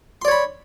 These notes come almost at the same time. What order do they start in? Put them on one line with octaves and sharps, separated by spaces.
C6 D5 C#5 B5